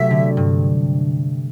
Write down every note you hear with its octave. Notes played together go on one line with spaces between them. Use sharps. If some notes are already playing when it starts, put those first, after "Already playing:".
Already playing: C3 F#3 A3 E5
D3
G2